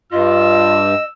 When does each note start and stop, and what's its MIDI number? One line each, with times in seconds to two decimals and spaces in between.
0.12 0.94 43
0.12 0.83 65
0.12 1.03 75
0.12 1.13 88